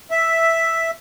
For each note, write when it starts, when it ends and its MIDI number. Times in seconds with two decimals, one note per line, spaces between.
0.11 0.91 76